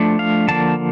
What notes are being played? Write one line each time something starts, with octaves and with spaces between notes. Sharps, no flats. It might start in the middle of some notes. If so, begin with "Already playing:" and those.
Already playing: F3 A3 D4
F5
D3 F3 A#3 A5